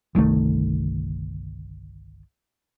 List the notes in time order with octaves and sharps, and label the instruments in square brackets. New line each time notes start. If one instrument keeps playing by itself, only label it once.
[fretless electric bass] G1 C2 D#3 A3